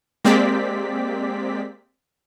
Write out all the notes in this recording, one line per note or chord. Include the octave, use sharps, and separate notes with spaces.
G#3 A#3 C4 G4 D5 B6